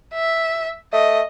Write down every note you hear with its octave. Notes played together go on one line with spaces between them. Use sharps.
E5
A3 D#5